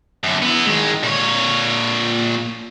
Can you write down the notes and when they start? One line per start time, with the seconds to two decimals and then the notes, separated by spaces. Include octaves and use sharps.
0.24 F#2 D3
0.42 B3 E4
0.66 D#3 G#3
1.03 A#2 C#5